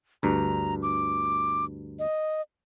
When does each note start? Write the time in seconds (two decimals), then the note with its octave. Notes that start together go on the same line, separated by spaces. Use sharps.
0.23 D2 G2 A#5
0.83 D6
1.99 D#5